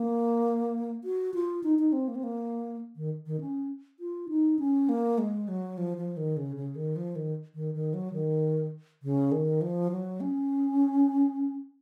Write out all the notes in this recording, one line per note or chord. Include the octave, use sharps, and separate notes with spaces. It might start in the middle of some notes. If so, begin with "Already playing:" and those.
Already playing: A#3
F#4
F4
D#4
D#4
C4
A#3
C4
A#3
D#3
D#3
C#4
F4
D#4
C#4
A#3
G#3
F#3
F3
F3
D#3
C#3
C#3
D#3
F3
D#3
D#3
D#3
F#3
D#3
C#3
D#3
F3
F#3
C#4